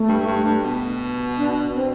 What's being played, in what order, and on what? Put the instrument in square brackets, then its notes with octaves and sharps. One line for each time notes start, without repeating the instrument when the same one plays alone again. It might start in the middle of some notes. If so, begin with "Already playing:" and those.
Already playing: [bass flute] A3
[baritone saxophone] G2
G2
G2
B2
[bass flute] D4
C4